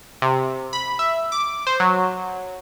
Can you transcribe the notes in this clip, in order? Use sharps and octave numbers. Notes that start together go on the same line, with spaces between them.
C3
B5
E5
D6
C5
F#3